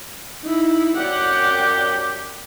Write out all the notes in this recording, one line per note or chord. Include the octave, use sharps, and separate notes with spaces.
D#4 E4
F#2 G4 D5 F#5